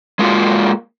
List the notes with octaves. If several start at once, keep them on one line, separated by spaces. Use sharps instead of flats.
G#3 A#3 F4 F#4